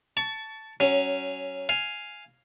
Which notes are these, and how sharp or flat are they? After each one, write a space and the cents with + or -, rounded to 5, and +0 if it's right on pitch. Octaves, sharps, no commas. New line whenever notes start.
A5 +0 C#6 +30
F#3 +20 C#4 +0
F5 +0 G#5 +0